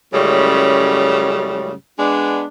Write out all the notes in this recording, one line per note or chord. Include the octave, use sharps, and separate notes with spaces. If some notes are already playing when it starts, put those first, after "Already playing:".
F#2 A2 C#3 G3 G#3
G#3 B3 D4